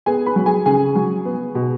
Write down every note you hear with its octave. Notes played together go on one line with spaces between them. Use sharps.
B3 G#4 G#5
B4 B5
F#3
G#4 G#5
C#3 G#4 G#5
F#3
B3
B2